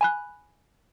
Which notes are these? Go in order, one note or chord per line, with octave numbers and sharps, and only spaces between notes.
G#5 B5 F#6